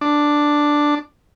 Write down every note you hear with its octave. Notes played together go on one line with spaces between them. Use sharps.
D4